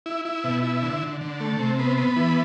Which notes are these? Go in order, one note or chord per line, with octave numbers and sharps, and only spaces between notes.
E4
E4
B2
E4
D3
D3
D3
A3
C3
B3
B3
E3